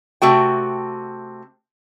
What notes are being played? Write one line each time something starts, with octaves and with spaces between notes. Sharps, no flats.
C3 A3 F#4 G5